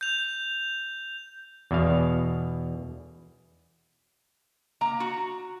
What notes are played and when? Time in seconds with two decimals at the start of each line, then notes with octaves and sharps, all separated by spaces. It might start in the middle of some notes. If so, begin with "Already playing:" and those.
0.01 G6 F7
1.71 E2 B2 F5
4.81 A#3 A#5
5.00 F#4